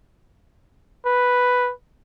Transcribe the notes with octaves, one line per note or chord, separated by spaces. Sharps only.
B4